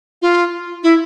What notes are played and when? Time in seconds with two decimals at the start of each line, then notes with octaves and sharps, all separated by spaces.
0.22 F4
0.83 E4